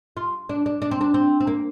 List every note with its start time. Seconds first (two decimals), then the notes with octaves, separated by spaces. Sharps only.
0.17 F4
0.49 D4
0.66 D4
0.82 D4
0.91 C4
1.01 D4
1.14 C4
1.40 C4
1.47 A#3